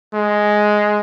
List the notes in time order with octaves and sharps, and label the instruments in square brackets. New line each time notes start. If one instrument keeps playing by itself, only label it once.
[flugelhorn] G#3